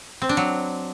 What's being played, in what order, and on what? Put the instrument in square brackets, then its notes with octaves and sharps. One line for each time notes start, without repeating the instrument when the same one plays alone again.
[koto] C4
D4
F#3